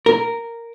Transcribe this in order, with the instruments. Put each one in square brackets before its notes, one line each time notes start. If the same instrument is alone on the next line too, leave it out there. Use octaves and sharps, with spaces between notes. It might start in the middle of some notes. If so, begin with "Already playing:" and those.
[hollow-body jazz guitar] A#4